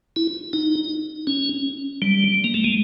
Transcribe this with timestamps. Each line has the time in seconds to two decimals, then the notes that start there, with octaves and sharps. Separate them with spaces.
0.16 E4
0.53 D#4
1.27 C#4
2.02 G3
2.44 A#3
2.54 A3
2.64 G#3